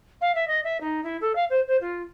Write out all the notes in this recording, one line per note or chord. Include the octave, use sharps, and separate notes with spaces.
F5
E5
D#5
E5
D#4
E4
A4
F5
C5
C5
F4